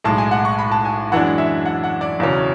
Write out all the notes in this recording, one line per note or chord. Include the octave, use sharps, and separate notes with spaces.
B1 A2 G#3 A5
G#5
F#5
C#6
B5
A5
G#5
F#2 E3 G#3 D4 F#5
E5
F#5
F#5
D5
E1 E2 C#3 F#3 C#4